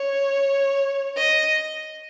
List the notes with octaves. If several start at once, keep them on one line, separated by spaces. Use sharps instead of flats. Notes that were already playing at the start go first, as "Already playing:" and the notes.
Already playing: C#5
D#5